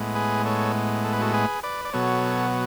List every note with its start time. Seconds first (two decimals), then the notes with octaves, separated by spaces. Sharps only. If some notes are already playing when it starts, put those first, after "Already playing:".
Already playing: A2 G#3 B3
0.15 G#4 B4
0.45 A4 C#5
1.05 A4
1.13 B4
1.21 F#4 A4
1.33 G#4 B4
1.63 B4 D5
1.85 D5
1.93 B2 F#3 B3 A4 C#5